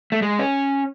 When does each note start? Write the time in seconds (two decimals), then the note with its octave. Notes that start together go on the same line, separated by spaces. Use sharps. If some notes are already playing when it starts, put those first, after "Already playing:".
0.12 A3
0.22 G#3
0.39 C#4